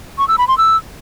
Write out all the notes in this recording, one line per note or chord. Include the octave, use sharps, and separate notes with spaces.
C#6
E6
B5
C6
E6